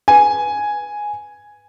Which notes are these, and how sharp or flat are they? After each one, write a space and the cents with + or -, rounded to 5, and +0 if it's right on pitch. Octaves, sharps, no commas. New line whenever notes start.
B4 +0 G#5 +0